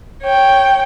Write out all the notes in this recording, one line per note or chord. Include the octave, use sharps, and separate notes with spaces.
C#5 G5